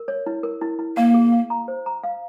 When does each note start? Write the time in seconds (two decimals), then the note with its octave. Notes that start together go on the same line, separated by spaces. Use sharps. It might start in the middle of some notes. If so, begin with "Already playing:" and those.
Already playing: A#4
0.08 C#5
0.26 E4
0.43 A#4
0.61 E4
0.79 E4
0.97 A#3 F5
1.14 G#4
1.32 F5
1.50 A#5
1.68 C5
1.86 A#5
2.04 F5